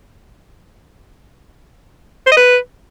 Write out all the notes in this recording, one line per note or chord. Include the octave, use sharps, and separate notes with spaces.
C5
D#5
B4